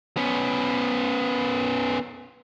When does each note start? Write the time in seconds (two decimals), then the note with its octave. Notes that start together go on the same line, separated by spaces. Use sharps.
0.17 B3 C#4